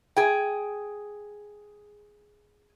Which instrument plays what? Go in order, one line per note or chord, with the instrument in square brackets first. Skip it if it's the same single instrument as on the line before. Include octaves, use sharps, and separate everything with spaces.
[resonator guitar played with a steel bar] G#4 G5